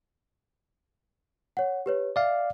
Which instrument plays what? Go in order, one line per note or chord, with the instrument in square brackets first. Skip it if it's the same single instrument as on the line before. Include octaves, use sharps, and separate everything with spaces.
[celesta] C#5 F#5
G4 B4 C#5
[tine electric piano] D5 F5 [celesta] E5